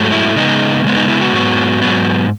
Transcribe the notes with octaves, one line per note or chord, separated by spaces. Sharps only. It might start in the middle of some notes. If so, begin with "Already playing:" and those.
Already playing: G#2 F#3 A3
E4
C#3 G#3 B3 D#4
C#3 G#3 B3
D#4
E4
F#4
G#2 F#3 B3
G#2 F#3 B3